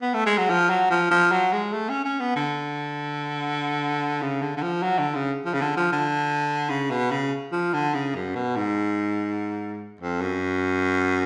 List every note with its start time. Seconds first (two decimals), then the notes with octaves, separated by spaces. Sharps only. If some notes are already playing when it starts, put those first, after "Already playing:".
0.02 B3
0.14 A3
0.26 G#3
0.38 F#3
0.50 F3
0.70 F#3
0.90 F3
1.11 F3
1.32 F#3
1.53 G#3
1.73 A3
1.89 C#4
2.05 C#4
2.20 B3
2.36 D3
4.22 C#3
4.42 D3
4.57 D3
4.62 F3
4.83 F#3
4.99 D3
5.15 C#3
5.45 F3
5.53 C#3
5.61 D3
5.77 F3
5.92 D3
6.69 C#3
6.91 B2
7.11 C#3
7.52 F3
7.73 D3
7.94 C#3
8.15 F#2
8.35 B2
8.56 G#2
10.01 F2
10.21 F#2